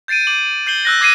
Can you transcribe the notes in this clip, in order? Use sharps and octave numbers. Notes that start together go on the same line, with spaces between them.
G6 A6 C7 D7 D#7
D6 F#7
G6 C7 F#7 G7
E6 F#6 A#6
D6 G#6 C7 D#7